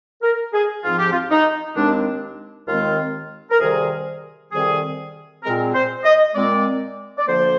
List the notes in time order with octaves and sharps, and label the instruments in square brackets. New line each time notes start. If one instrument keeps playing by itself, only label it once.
[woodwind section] A#4
G#4
G#2 F3 C4 F4
G4
F4
D#4
D#2 D#3 G#3 C4 D4
D#2 D#3 G#3 C4 F4
A#4
F2 C3 D#3 G3 C4 G#4
F2 C3 D#3 G3 C4 G#4
A#2 G#3 C4 A#4
C5
D#5
A#2 G#3 C4 D5
D5
D2 D3 F3 A#3 C5